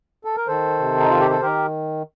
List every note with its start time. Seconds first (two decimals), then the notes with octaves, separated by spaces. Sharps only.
0.25 A4
0.36 A#4
0.47 D#3 A4 C5
0.79 C3
1.00 D#4
1.10 D#3 F4
1.21 G4
1.31 A4
1.41 D#3 G4 A#4